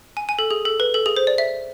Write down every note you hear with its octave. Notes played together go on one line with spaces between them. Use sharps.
G#5
G#5
A4
G#4
A4
B4
A4
G#4
C5
D5
E5